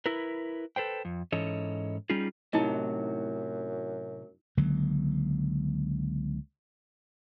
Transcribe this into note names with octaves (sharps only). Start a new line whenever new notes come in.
E4 A#4 B4
A4 B4 C5 G5
F2
G#2 E3 C#4 A4 C#5 D#5
G3 C#4 D#4 F4 G#4
F#2 A2 C3 F#3 D#4 E4 D#5
C#2 D3 F#3 A#3